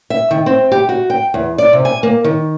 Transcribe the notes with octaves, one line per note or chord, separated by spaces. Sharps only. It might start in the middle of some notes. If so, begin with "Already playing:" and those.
E5
D#3
C4
G4
F#4
G5
E2
D5
C3
G#5
A#3
D#3